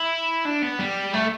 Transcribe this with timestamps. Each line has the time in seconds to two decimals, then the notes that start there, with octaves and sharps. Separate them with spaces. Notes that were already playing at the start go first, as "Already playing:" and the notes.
Already playing: E4
0.45 D4
0.62 B3
0.79 G3
1.13 A3